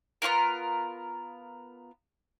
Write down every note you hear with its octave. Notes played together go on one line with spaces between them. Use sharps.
B3 C#4 F4 A#4